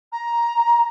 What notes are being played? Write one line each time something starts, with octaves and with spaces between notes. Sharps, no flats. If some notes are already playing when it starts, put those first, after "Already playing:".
A#5